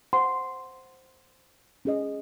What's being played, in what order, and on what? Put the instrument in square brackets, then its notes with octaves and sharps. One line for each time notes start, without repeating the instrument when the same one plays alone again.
[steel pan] C5 F#5 C6
C#4 G#4 D#5